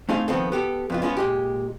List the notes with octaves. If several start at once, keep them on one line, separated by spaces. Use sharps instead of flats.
A3 C4 D#4 F4 G#4 F5
D#3 F3 B3 C4 A4
B3 G4 A4
F2 B3 F4
G#3 B3 C#4 E4 F4
A#2 G#3 G4